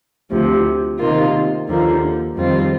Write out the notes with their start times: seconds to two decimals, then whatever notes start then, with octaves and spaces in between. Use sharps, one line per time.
0.31 D2 C3 F3
0.99 C3 D#3 A#3 F4
1.68 D#2 D3 F3 A#3
2.35 F2 D#3 G3 C4 F4